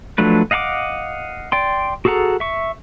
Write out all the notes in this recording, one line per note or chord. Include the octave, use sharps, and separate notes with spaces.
F3 F#3 A3 D4 B4
D#5 F5 F#5 A5 D6
D5 G5 C6
F#4 G#4 A4 F#5 A#5
E5 C#6